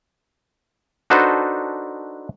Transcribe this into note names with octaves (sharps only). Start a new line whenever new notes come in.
D4 D#4 F#4 A4 B4 C5